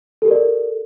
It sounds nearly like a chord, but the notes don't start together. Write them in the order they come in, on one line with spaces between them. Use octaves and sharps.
A4 G4 A#4 D5